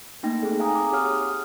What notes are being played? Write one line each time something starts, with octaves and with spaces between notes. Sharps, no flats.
A3 A#3 D#4 G5 A#6
C4 D#4 G#4 A4
F5 G#5 A#5 D#6
D6
G4 G#4 C#5 F#5 D#6 F6
F6